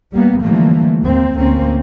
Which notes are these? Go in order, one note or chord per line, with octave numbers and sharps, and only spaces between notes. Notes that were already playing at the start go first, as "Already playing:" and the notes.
G3 A#3 B3
D3 E3 F3 G3 A3 A#3
D#2 A#3 C4
D2 D3 A#3 C4 C#4